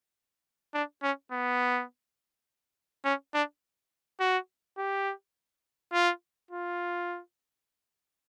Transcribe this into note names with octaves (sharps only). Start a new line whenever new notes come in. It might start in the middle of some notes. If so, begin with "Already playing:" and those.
D4
C#4
B3
C#4
D4
F#4
G4
F4
F4